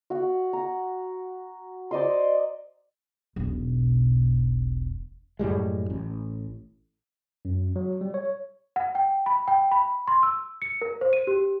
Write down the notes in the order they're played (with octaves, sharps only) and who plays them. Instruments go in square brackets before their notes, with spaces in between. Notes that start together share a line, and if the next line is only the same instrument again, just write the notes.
[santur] F#4 F#5
A#5
C5 D5 D#5 C6
[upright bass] E1 B1
[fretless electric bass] F#2 A2 G3 G#3
A1
[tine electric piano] F#2
F#3
G3
C#5
[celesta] F#5
G5
B5
G5
B5
C6
E6
C#7
A#4
C5
D#7
G4